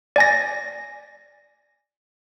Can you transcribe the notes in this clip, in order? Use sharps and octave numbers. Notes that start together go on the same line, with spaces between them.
D5 G#5 A#6